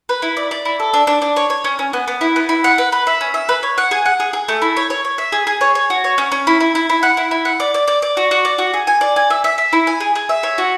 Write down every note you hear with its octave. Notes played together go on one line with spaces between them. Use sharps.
B4
E4
D5
D5
E4
A4
D4
D4
D4
C#5
C#5
C#4
C#4
B3
B3
E4
B3
E4
F#5
B4
B4
E5
C#4
E5
B4
C#5
F#5
G#4
F#5
G#4
G#4
A3
E4
C#5
C#5
C#5
E5
G#4
G#4
C#5
C#5
F#4
C#5
C#4
C#4
E4
E4
E4
E4
F#5
E4
E4
F#5
D5
D5
D5
D5
F#4
F#4
D5
F#4
G#4
G#5
D5
G#5
E5
E5
E5
E4
G#5
G#4
G#4
E5
C#5
F#4